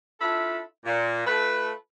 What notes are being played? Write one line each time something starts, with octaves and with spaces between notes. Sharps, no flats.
D4 E4 F4 A4 E5 B5
A#2
A3 F4 A4 B4